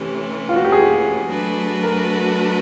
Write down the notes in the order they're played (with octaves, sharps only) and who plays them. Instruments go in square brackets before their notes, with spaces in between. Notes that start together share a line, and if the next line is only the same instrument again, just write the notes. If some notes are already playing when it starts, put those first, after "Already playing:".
Already playing: [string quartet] C3 E3 A3 C#4 [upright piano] G4
[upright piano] F4
F#4
G4
G#4
[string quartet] F#3 A3 D4 F#4 B4
[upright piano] A#4